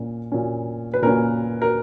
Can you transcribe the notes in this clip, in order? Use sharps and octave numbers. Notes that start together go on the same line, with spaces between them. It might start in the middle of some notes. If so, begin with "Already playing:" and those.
Already playing: A#2 A#3 C#4
A#2 A#3 C#4
B4
A#2 A#3 C#4 A#4
A#4